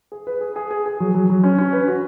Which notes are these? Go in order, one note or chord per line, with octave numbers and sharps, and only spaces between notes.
G#4
B4
G#4
G#4
G#4
G#4
F#3
F#3
F#3
C#4
C#4
B4
F#4